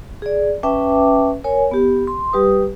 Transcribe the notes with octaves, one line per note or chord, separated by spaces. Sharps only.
G#4 D5
C#4 B4 E5 G5 A5 D6
A#4 C#5 G#5
B3 G4
C6
G3 G4 B4 D#6